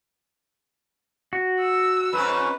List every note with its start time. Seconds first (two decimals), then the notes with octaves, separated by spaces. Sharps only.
1.33 F#4
1.61 E6
2.13 F2 G#2 C#4 B4